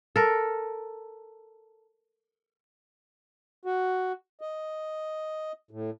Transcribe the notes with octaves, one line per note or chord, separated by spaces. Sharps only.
A4 A#4
F#4
D#5
A2